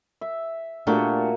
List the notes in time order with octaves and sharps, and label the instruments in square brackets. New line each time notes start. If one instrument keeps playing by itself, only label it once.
[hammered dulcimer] E5
[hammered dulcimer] A#2 F#4 A#4 [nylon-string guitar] A3 D4 G4